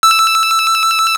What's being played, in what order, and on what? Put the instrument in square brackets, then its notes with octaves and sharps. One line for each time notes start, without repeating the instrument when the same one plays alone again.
[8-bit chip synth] E6